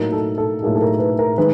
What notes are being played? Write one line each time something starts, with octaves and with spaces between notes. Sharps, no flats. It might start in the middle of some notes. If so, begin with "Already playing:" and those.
Already playing: A2 F#3 A#3 D#4 A#4
A4
A4
A2 F#3 A#3 D#4 G#4
A4
A#4
B4
A#4
D#3 G#3 B4